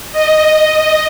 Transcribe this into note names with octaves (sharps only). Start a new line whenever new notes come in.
D#5